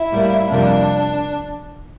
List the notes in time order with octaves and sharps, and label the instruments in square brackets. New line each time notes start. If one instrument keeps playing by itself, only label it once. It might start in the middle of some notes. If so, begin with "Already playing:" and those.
Already playing: [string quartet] E4
A2 G3 A#3
F2 C3 G3 A#3 D4